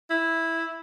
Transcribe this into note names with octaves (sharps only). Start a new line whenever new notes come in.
E4